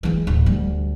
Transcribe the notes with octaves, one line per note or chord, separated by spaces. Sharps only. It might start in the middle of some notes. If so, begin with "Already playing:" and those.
E3 G#3
D1
D2 G3